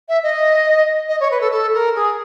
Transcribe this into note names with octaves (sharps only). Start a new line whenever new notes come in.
E5
D#5
D#5
C#5
B4
A4
A4
A#4
G#4